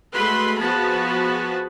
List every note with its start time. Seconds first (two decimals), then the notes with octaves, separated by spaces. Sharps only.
0.13 G#3 A3 F#4 B4 B5 C6
0.58 F3 B3 F#4 G#4 A5 B5